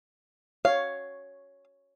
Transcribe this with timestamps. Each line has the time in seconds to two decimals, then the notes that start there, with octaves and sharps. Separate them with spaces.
0.65 C#5 F5